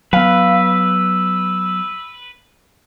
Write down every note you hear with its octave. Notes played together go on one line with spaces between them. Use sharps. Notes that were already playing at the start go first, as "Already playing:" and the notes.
F#3 B3 B4 F5 E6